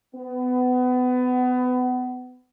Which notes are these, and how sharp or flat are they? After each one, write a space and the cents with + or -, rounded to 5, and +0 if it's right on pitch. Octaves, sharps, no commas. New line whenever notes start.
B3 +25